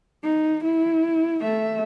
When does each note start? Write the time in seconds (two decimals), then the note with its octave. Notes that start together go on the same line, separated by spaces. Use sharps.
0.23 D#4
0.64 E4
1.42 A3 E5